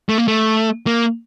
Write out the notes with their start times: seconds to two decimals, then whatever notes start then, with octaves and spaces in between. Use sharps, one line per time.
0.09 A3
0.18 A#3
0.28 A3
0.87 A#3